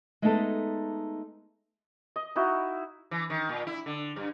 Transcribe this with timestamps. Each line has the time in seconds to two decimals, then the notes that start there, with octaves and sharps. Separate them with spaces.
0.22 G#3 A3 B3 D#4 G#4 A4
2.16 D#5
2.36 D#4 E4 F#4
3.11 E3
3.30 D#3
3.49 A#2
3.67 E4
3.86 D3
4.16 G2